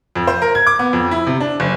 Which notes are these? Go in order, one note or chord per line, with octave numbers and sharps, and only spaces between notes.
F2
C5
A#4
G#6
D6
B3
F2
E4
C3
D4
F#1